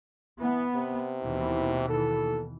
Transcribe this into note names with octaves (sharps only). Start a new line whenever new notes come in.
E3 B3
C3
D#2 B2 E3
A4